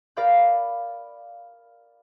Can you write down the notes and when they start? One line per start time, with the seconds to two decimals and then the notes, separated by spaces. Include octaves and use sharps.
0.17 A#4 D5 F5 B5 G6